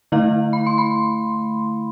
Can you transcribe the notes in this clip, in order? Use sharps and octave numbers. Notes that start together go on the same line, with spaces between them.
D3 A3 E4 F5
B5
C6
B5